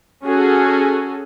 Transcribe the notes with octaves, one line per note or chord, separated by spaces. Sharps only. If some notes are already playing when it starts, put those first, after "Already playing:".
C#4 F#4 G#4 A4